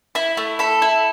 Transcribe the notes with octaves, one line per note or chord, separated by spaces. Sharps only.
E4 B5
A3
A4 B5
E4